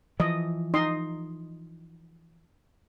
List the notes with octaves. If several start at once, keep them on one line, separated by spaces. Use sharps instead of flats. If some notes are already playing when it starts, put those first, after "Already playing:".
E3 F3 D#5
D#4 D#5 C6